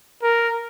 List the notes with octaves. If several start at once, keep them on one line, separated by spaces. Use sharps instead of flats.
A#4